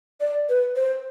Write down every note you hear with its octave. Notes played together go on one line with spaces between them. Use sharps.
D5
B4
C5